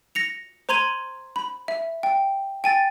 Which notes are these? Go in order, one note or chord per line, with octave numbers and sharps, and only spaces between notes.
A#6 C#7 F7
C5 A#5 C6 G#6 D#7 F#7
B5
E5
G5
G5 G#5 A6